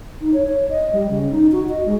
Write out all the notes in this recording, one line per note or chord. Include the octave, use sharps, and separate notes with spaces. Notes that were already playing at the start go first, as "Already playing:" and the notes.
D#4
C#5
C#5
D#5
G3
C#3
D#4
F#4
D#5
G#3